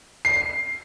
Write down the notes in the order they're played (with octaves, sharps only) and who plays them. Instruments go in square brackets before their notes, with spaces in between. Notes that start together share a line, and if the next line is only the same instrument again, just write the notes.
[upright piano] C7